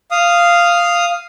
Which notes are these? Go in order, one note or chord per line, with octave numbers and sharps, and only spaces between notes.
F5 D#6